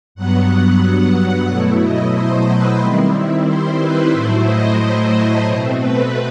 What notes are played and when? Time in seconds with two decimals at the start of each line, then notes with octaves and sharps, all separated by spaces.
0.15 G2 F#3 B3 F#5
0.48 F#5
0.81 F#5
1.14 F#5
1.47 B2 F#3 A3 E4 F#5
1.81 D#5
2.13 C5
2.47 B4
2.80 D#3 G3 C4 E4
3.46 C5
3.80 B4
4.12 A2 F#3 A3 E4 C5
4.45 D#5
4.79 C5
5.45 B2 A3 C4
5.78 B4